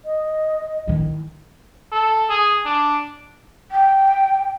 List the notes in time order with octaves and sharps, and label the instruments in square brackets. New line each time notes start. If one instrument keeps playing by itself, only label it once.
[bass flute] D#5
[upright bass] D#3 E4
[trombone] A4
G#4
D4
[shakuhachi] G5